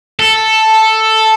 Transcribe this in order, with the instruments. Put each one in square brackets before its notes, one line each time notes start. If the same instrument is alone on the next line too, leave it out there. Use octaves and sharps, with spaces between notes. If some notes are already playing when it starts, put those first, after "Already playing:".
[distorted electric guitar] A4